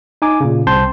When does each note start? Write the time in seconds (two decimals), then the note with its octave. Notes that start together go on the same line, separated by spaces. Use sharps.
0.22 D#4 G#5 D6
0.41 A#2 C#3
0.67 C2 C4 A5 C6 G6